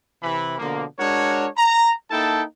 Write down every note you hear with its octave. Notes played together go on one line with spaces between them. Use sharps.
C3 E3 B5
B2 D3 F3 A#3
G#3 D4 F#4 A#4 C#5
A#5
A#3 D#4 E4 A4 G5 A5